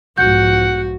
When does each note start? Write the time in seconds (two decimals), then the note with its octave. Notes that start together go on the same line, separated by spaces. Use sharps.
0.18 B1 G#2 F3 F#4 F#5 G6